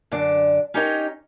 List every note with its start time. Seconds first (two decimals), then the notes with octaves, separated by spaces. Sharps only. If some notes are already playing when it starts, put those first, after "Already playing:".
0.12 F#2 D3 D5
0.74 C#4 D#4 G4 A#4 C#5 D#5